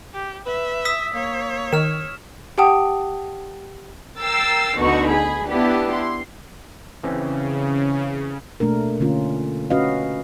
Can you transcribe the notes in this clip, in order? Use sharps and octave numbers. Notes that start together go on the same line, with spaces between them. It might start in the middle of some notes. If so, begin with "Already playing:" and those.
G4
B4 E5
D#6 E6 B6
A#3 C#5
D#3 F6 E7
G4 F#5 G5 A5 D#6
A#4 G5 E6 A6 C7
D2 B2 D3 D#4 F#4 C#6
G#4 B5
B3 D4 E4 G4 B4
C6
C#3 E3 C4 C#4
B2 A3 A#3 D4 A#4
D3 A3 C#4 F4
C#4 F#4 B4 D#5 F5